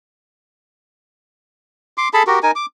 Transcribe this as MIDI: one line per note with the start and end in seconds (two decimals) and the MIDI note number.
1.98 2.09 84
1.98 2.09 86
2.14 2.23 68
2.14 2.23 69
2.14 2.23 81
2.14 2.23 83
2.27 2.39 66
2.27 2.39 67
2.27 2.39 70
2.43 2.51 63
2.43 2.51 70
2.43 2.51 80
2.56 2.66 86